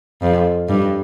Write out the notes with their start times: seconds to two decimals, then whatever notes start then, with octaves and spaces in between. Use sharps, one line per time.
0.22 F2
0.68 G2